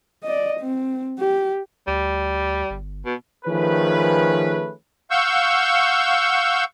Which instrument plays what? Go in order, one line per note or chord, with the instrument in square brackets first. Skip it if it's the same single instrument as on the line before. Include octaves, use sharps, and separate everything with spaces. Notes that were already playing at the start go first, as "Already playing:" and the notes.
[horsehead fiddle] D5 D#5
C4
G4
[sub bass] D2 [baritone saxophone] G3
[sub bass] G1
[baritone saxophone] B2
[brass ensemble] D#3 F3 A3 C#4 G#4 B4
[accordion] F5 F#5 C#6 E6 G6